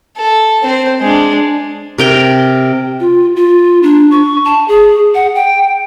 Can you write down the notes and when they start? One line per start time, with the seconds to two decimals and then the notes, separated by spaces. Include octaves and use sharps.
0.17 A4
0.63 C4 C5
1.01 G#3 D4
1.98 C3 A#4 G5
3.00 F4
3.36 F4
3.83 D4
4.11 C#6
4.45 A5
4.68 G#4
5.15 F#5
5.35 G5